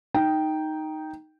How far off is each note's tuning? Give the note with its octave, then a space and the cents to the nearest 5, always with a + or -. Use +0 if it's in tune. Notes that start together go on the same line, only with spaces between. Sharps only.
D#4 +0 G5 -5